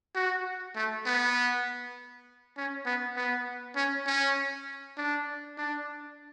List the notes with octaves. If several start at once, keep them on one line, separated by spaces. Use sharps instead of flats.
F#4
A3
B3
C#4
B3
B3
C#4
C#4
D4
D4